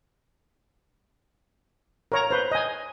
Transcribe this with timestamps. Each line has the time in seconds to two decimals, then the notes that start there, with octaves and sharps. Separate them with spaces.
2.12 A#4 C#5 A#5
2.31 B4 C5
2.52 D#5 G#5